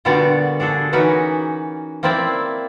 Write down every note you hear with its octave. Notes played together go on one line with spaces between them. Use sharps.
A#2 D3 G3 B3 F#4 D5
D4 F#4 G#4 A4
E3 C#4 D#4 F#4 A#4 B4
A#3 C4 E4 D5 E5